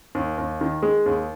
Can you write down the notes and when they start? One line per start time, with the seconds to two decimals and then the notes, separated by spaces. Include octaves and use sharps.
0.15 D#2
0.38 D#2
0.61 D#3
0.82 G#3
1.06 D#2